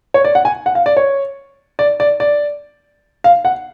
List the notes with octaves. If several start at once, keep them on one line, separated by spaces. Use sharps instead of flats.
C#5
D5
F#5
G#5
F#5
F5
D5
C#5
D5
D5
D5
F5
F#5